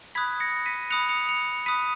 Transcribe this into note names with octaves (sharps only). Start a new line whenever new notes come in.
B5 D#6 F#6 G#6 B6
A#6 C#7
B6 D#7
B5 D#6 F#6 C#7 F7
C#7 F7
C#7 F7
B5 D#6 F#6 B6 D#7